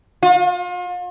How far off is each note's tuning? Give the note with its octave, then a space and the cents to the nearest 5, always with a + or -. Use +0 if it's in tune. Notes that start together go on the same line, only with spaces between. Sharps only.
F4 +40